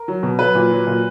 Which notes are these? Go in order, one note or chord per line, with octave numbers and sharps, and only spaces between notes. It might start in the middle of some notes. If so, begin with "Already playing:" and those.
Already playing: A#4
F#3
B2
F#3 B4
A#2
F#3
A#2